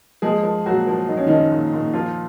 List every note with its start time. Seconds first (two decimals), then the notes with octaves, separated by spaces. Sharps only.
0.22 F3 G#3 G#4
0.43 F3
0.66 A#2 F#3 F#4
0.87 F3
1.08 F3 D#4
1.17 C#4
1.27 D#3 F3 D#4
1.51 A#2
1.73 A#2
1.93 F3 F4